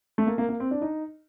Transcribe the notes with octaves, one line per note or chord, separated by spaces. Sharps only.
A3
A#3
A#3
A#3
C4
D4
D#4